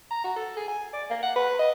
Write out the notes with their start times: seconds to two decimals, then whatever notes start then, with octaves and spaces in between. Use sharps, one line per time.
0.11 A#5
0.24 F#4
0.36 A4
0.57 G#4
0.68 G#5
0.93 D5
1.10 A#3
1.23 F#5
1.36 B4
1.59 D#5